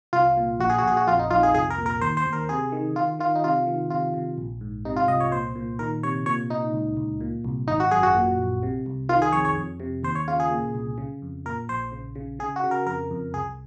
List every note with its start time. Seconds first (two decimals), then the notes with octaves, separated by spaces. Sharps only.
0.13 C2 F4
0.37 A#2
0.60 A#1 F#4
0.70 G#4
0.78 F#4
0.83 A#1 G#4
0.97 F#4
1.07 F2 F4
1.19 D#4
1.31 F2 F4
1.43 G#4
1.54 C2 G#4
1.70 A#4
1.78 A#2
1.86 A#4
2.01 D#2 C5
2.17 C5
2.26 D#2
2.33 A#4
2.49 C3 G#4
2.72 D#3
2.96 D#3 F4
3.19 D#3 F4
3.35 D#4
3.44 C3 F4
3.67 D#3
3.90 C3 F4
4.14 C3
4.38 A#1
4.61 G#2
4.85 C3 D#4
4.96 F4
5.08 C2 D#5
5.20 C#5
5.32 A#2 C5
5.55 A#2
5.79 D#3 A#4
6.03 C3 C#5
6.26 A#2 C#5
6.50 A#2 D#4
6.73 C#2
6.97 C#2
7.21 A#2
7.44 C2
7.68 G#1 D#4
7.80 F#4
7.91 F#2 G#4
8.03 F#4
8.15 A#2
8.38 A#1
8.63 C3
8.86 C2
9.09 D#3 F4
9.22 G#4
9.33 F2 C#5
9.45 C#5
9.56 F2
9.80 C3
10.03 D#2 C5
10.15 C#5
10.28 C#3 F4
10.40 G#4
10.51 A#2
10.75 C2
10.98 C#3
11.22 F2
11.46 A#2 A#4
11.69 A#1 C5
11.92 C#3
12.15 C#3
12.39 C#3 G#4
12.56 F#4
12.64 C#3
12.71 A#4
12.86 F2 A#4
13.11 F2
13.33 C2 G#4